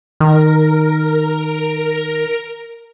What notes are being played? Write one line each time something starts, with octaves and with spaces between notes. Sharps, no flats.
D#3 A#4